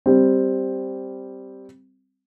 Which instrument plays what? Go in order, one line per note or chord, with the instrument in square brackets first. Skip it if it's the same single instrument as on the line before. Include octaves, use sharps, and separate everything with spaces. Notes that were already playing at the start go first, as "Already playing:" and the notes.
[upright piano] G3 C4